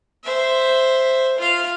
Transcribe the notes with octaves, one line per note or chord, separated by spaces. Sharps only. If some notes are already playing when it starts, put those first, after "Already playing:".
C5 E5
F4 F5